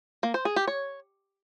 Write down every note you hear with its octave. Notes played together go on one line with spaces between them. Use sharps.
A#3
C5
G#4
G4
C#5